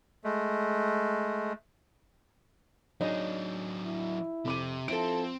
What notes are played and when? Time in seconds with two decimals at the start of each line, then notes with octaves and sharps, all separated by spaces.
0.24 G#3 A3
3.01 F#3 D4 D#4 G#4 C#5 D#5
3.85 E4
4.45 F2 C3 D6 D#7
4.88 F3 C4 E4 A4 D7